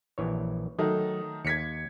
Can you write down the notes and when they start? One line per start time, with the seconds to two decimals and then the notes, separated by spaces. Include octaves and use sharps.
0.18 A#1 E3 C#5
0.79 D#3 F#3 A3 D#4
1.45 D#2 G#6 B6 C#7